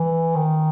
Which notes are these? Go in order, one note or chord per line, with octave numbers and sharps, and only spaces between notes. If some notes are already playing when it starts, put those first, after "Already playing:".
Already playing: E3
D#3